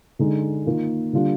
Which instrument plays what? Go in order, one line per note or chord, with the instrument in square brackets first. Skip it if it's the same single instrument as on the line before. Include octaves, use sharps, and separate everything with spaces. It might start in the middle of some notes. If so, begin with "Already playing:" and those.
[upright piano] D3 G#3 D#4
D#3 A#3 F4
D3 G3 D4 F4